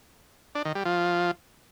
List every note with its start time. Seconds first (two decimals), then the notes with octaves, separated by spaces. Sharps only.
0.55 D4
0.65 D#3
0.75 G3
0.85 F3